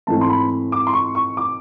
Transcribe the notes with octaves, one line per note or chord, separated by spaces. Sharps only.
G#2 E3 A3 C4 A5
C6
B5
D6
C6
C#6
C#6
D6